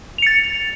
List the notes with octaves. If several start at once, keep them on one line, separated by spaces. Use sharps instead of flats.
A6 C#7 F7